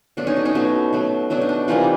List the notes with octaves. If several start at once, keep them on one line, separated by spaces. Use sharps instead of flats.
B2 F#3 A3 D4
C#4 D#4
D4
C#4 D#4
B2 F#3 A3
B2 F#3 A3
B2 F#3 A3 D4
D#4
D4
C3 E3 G3 A#3 D#4 F4